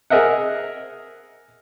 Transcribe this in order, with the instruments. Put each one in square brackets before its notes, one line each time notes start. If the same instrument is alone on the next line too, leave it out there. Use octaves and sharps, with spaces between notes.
[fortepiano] G#4 A#4 D#5 E5 F#5